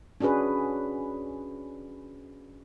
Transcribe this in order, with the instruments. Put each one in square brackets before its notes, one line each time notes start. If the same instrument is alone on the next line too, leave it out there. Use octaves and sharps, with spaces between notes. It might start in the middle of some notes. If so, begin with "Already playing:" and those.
[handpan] C#4 D4 F#4 G#4 B4